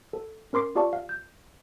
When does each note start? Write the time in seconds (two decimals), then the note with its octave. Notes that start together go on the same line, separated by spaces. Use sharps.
0.13 A4
0.53 C#4 A#4 C6 D6 C7
0.75 F4 G4 D5 F5 A5 C#6
0.93 F5
1.09 G6